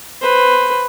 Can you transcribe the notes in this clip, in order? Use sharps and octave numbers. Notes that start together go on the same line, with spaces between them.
B4 C5